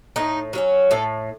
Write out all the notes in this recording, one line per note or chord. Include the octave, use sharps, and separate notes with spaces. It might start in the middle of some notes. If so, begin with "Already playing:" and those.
A2 D#4
F#3 A#3 C#4
A2 A4